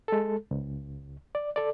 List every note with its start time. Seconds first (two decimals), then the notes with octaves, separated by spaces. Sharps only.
0.08 G#3 A4
0.51 C#2
1.35 D5
1.56 A4 D5